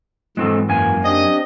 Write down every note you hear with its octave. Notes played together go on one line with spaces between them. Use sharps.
G#2 E3 F#3 G#3 C4 A4
F#2 A#3 G#5
C4 D4 G4 D#5